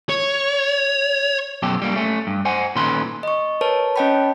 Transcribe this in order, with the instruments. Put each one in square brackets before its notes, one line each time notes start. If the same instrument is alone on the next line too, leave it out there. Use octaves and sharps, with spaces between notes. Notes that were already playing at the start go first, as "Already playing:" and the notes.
[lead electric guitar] C#5
[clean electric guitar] F#2 B2 G4 A4
G3 A#3 D4
A3 C#4
G2
C5 F#5 G#5
A#2 D#3 C#4 A4 B4 C6
[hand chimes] D#5 C#6
A#4 B4 C#5 A5
C#4 C#5 D#5 G5 A5 B5